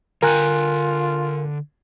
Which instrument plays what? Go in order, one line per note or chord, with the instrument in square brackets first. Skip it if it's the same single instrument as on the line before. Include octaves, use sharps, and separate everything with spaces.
[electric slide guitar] D3 G5 [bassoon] F4 [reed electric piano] A#4 G#5 F#6